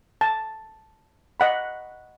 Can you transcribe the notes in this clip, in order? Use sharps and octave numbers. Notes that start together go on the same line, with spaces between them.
A5
D#5 F#5 B5